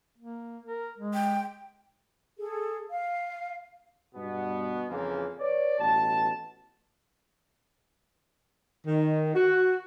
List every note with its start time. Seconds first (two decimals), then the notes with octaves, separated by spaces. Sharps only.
0.18 A#3
0.65 A#4
0.98 G#3
1.14 G5
2.37 G#4 A4
2.90 F5
4.15 G2 B2 B3
4.89 F2 C#3 E3 F3 A#3
5.39 B4 C#5 D5
5.80 A1 B2 A5
8.86 D#3
9.35 F#4